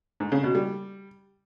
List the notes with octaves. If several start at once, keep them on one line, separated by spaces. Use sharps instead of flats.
G#2
C#3
B2
G3